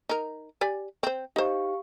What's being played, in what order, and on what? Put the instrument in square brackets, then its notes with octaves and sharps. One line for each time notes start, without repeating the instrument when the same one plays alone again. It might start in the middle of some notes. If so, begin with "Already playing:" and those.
[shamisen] D#4 A#4
G4 D5 G#5
C4 C5
[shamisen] D#4 C5 [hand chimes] G4 F5 C#6